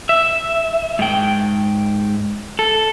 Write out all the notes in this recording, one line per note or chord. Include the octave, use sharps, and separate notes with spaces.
E5
G#2 G5
A4